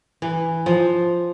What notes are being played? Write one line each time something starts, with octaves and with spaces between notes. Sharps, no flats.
E3
F3